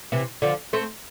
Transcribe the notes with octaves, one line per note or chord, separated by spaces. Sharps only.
C3 E3
D3 F3
A3 C4